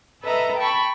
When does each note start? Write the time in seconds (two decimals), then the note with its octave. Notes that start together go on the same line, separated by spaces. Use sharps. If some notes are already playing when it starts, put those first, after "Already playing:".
0.22 A4 B4 D#5 E5 A#5
0.57 G5 A5 B5 C#6